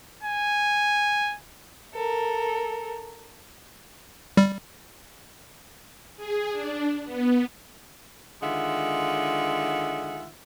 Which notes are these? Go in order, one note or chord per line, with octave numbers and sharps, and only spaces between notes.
G#5
A4 A#4
G3
G#4
D4
B3
D3 D#3 G#3 F4 E5 F#5